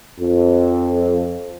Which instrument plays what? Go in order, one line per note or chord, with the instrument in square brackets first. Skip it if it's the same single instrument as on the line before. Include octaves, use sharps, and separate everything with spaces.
[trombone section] F2